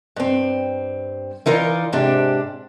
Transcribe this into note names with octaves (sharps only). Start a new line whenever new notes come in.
G2 C4
E3 D#4 F4 A#4 D5
G#2 C3 D4 G4